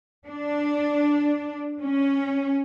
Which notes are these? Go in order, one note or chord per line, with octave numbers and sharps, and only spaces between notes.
D4
C#4